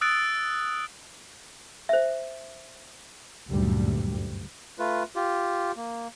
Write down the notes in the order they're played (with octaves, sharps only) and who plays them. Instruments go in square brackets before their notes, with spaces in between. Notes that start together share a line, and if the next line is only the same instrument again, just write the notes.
[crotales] D#6 E6 F#6 A6 D7
[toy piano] C5 E5
[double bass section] F#1 D2 G2 A#2 G3
[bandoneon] A3 F4 B4
F4 G4
A#3